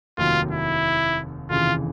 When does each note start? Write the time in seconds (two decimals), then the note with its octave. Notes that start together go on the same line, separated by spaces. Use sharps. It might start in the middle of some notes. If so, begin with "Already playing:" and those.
0.18 F1 D#2 D#3 F#3 A#3 F4
0.51 E4
1.50 F1 D#2 C#3 E3 F4